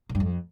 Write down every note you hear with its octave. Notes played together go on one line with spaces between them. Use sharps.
A#2
G2
F2